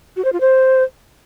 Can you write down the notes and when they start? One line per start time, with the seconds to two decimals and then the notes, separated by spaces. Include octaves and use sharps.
0.16 F#4
0.25 C5
0.33 F4
0.41 C5